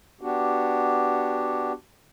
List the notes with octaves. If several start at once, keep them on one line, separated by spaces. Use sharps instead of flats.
B3 D4 F#4 G4